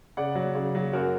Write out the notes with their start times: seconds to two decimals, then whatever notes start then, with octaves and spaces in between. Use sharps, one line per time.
0.17 C#3 D5 F#5
0.35 F#3
0.55 C#3
0.75 F#3
0.93 F#2 F#4 A#4